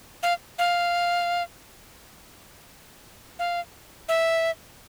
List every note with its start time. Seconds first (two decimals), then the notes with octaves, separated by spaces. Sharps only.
0.23 F5
0.59 F5
3.39 F5
4.09 E5